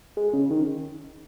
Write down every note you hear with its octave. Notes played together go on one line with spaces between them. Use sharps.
G#3
C#3
D#3